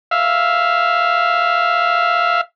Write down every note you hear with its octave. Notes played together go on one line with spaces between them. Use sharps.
E5 F5